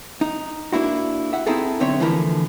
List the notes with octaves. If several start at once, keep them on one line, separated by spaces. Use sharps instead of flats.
D#4
A#3 D4 E4 F#4
E5 F#5
C4 D#4 E4 G#4 A4
B1 D3 C4 C#5 E5
D3 E3 F3 A3 E4 A#4